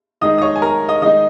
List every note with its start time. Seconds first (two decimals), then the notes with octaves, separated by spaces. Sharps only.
0.21 D#3 G#3 D#4 D#5 D#6
0.38 D#6
0.42 C#5 C#6
0.56 G#5
0.62 A#4 A#5
0.88 D#5 D#6
1.02 D#3 G#3 D#4 D#5 D#6